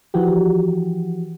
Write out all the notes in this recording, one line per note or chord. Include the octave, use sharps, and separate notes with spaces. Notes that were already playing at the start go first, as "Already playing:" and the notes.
E3 F3 F#4 G4